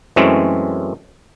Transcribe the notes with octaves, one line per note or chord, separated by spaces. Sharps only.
F#2 E3 G#3 A3 C4 C#4